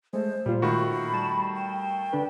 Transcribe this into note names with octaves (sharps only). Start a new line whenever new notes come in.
G#3 A3 C5
A#2 G3 F4
D#3 A3 F#4 B5
G3 A5 E7
G5
D3 D4 B4